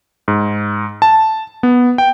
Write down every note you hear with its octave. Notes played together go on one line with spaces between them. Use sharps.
G#2
A5
B3
G5